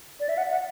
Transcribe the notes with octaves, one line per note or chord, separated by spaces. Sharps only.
D5
E5
F#5
F#5